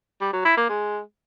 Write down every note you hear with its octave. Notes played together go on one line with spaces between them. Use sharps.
G3
F#3
E4
A#3
G#3